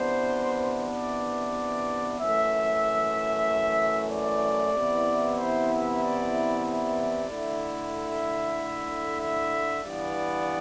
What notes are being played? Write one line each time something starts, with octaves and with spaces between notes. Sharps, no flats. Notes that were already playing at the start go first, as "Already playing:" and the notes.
Already playing: C3 E3 B3 D4 C5
D5
F#2 E3 A3 E5
D5
C3 E3 B3 E4
C5
E5
D5
D5
D3 A3 E4
E5
E5
G2 E3 B3 D5